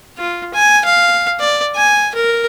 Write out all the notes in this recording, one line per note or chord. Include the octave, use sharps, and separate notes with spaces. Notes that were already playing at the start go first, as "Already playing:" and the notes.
F4
G#5
F5
D5
G#5
A#4